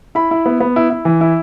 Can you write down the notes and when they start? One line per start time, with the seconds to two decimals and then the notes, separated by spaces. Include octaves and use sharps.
0.15 E4 B5
0.31 E4
0.46 B3
0.60 B3
0.76 E4
0.90 E4
1.05 E3
1.21 E4